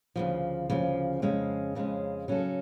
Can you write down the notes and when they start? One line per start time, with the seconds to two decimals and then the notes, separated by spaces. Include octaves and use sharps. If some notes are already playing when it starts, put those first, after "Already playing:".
0.16 D2 C#3 F3
0.70 D2 C#3 F3
1.22 F2 C#3 G#3 C#4
1.75 F2 C#3 G#3 C#4
2.28 C#3 F#3 C#4 F#4 A4